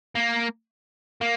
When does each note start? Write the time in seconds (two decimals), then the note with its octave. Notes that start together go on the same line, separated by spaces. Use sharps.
0.15 A#3
1.21 A#3